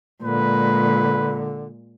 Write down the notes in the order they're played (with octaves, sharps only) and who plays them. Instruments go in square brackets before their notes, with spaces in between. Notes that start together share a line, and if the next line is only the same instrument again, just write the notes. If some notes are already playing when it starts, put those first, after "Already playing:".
[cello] A#2 G#3 [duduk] D3 [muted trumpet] B4